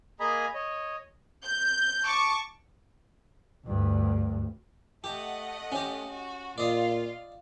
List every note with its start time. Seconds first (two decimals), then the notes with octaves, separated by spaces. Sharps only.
0.20 A#3 G#4 D#5 G#5 A#5 B5
0.54 C#5 D#5
1.45 G6
2.05 A5 C#6 D6
3.65 D2 G2
5.04 A3 G4 D#5 F#5
5.72 C#4 G4
6.06 F#4
6.58 A#2 F4 D5 D#5